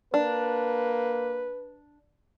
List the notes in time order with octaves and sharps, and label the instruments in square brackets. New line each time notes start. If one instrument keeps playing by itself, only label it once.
[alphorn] A#3 [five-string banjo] D4 [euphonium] B4